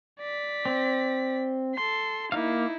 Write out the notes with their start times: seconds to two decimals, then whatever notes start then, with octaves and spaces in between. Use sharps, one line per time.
0.20 D5 B6
0.65 C4
1.75 A4 C6
2.32 A#3 D#4 E4 F5